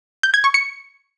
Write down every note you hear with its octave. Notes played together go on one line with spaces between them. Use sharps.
G6
G#6
C#6
C#7